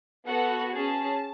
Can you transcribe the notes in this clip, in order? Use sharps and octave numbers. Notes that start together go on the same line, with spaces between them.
B3 F#4 A4 F#5
C#4 G#4 A5